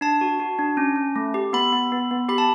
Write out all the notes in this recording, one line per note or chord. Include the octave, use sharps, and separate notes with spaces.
D4 A5
F#4
F#4
D4
C#4
C#4
A3
G4
B3 B5
B3
B3
B3
G4 B5
A5